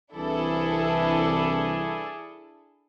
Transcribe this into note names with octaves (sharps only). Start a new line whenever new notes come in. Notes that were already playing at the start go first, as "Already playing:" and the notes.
C2 E3 D4 E4 G#4 A4